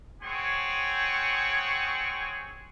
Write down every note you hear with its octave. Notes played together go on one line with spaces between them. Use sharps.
C4 G#4 C#5 F#5 G#5 C#6